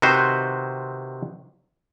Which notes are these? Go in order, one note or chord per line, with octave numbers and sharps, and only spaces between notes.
C3 D#3 C4 F#4 B4 C5